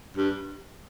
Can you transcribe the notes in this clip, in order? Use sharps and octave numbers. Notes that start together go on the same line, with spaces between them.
G2